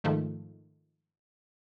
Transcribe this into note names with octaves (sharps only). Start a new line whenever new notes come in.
G#2 D#3 F3 A3